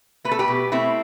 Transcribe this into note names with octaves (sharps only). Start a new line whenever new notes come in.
A3 B4
A4
G4 B4
B2
A3 C4 E4